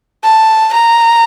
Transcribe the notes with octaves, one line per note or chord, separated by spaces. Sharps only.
A5
A#5